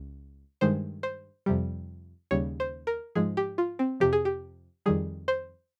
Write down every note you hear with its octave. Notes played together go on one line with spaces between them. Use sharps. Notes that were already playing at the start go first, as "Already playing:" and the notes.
Already playing: C#2
G2 D#3 G#3 C5
C5
F2 C3 G3
D#2 C#3 G3 C#5
C5
A#4
G#2 F3 G#3 G#4
G4
F4
C4
F2 C3 F3 G4
G#4
G4
F2 D#3 G3 G#4
C5